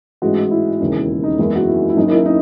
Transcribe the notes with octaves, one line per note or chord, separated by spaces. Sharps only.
A1 G#2 E3 G#3 F#4
E4
E1 D#2 C#3
D#4
F#1 E2 D#3 G#3 E4
F#4
E4
E4
F#1 F#2 D#3 D#4
E4
D#4